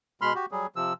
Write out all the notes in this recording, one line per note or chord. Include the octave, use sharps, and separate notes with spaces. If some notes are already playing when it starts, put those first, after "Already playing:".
B2 G#3 B5 C6 F6
F#4 G4
F#3 G3 G#4
C3 F3 E6